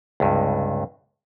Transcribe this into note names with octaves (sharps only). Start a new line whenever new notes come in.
C#2 G2 C3